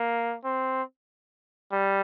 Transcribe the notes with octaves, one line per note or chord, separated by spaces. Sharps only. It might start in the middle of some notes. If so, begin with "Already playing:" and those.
Already playing: A#3
C4
G3